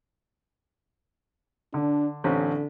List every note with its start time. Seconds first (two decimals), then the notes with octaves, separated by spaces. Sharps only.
1.74 D3 D4
2.24 A1 D3 C4 C#4